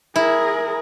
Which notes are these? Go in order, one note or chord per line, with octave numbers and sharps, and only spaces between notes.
E4 G#4 A#4